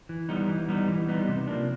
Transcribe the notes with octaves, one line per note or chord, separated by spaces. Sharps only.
E3
G3 B3 D#4
E3
G3 B3 D#4
E3
G3 B3 D#4
C3
F3 A#3 D4